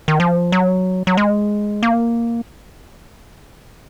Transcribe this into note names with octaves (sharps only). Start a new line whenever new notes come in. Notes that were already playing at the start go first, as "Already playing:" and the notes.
D#3
F3
F#3
F#3
G#3
A#3